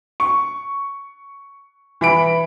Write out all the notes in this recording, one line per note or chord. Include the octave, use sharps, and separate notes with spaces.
C#6
E3 B5 D7